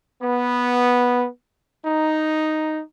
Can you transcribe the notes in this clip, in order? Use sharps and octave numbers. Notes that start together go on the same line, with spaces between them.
B3
D#4